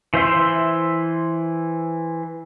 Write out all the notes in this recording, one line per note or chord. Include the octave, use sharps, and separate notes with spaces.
E3 C5 E5 C6